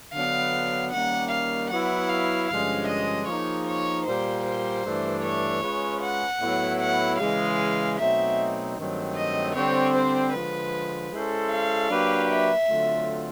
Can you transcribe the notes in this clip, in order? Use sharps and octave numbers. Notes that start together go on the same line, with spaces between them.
D3 F#3 B3 D4 F5
D#3 G3 A#3 C#4 F#5
F5
F#3 B3 E4 F#5
F5
G2 D3 F3 G#3 C#4 F5
D#5
F3 A#3 D#4 G#4 C#5
C#5
A#2 G3 A#3 C5
C5
G2 E3 A3 D4
C#5
G#3 C#4 F4 G#4 B4
F#5
A2 F#3 B3 E4
F#5
C#3 E3 G#3 F5
B2 F#3 A3 C4 D#4 E5
G2 D#3 F#3 A3 C4
D#5
D3 G3 C4 C#5
C5
D3 F3 G#3 B4
G#3 C#4 E4 A4 C5
F5
F#3 A#3 D4 G4 B4
E5
D3 F#3 A3 C4 F4